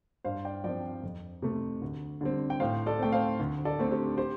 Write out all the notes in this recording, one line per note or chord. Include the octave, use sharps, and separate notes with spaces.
G2 C5 F5
D5 G5
F3 C4 D5 G5
F2
C3 A3
D2
D3 G3 C4
G5
A2 C5 F5
A4 D5
A3 C4 G5
C5 F5
D2
A4 D5
D3 A3 C4
G4 C5
G4 C5